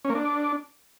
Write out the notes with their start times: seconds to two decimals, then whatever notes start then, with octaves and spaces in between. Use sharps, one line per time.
0.05 C#4
0.10 A#3
0.15 D4